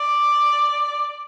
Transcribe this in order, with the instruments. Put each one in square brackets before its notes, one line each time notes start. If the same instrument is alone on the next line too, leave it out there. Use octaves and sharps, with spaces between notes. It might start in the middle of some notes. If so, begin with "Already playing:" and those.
Already playing: [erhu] D5